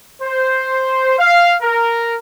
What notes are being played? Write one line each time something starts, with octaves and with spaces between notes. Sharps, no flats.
C5
F5
A#4